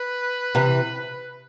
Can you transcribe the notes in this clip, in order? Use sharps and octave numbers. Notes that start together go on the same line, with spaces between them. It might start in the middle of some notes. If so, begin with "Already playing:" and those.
Already playing: B4
C3 E3